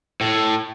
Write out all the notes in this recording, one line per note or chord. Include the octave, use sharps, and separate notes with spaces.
A2